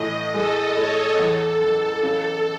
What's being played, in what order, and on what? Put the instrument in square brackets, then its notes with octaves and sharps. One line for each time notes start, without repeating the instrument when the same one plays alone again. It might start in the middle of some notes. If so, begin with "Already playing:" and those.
Already playing: [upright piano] A2 E3 [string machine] D#5
[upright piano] G#3 [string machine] A4
[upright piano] A2 [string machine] C#5
[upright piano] E2 [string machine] A4
[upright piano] F#1
C#3